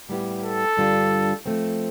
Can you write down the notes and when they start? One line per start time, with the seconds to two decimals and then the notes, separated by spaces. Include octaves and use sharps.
0.09 A2 G3 B3 E4 G4
0.43 A4
0.77 G2 D3 G3 D4 F4
1.46 F3 A3 C4